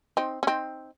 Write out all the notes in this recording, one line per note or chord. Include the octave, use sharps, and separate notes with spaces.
C4 D#4
C#4
C4 D#4